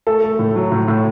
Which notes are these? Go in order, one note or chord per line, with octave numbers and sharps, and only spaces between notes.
A3 A4
A3
A2
F#3
A2
A2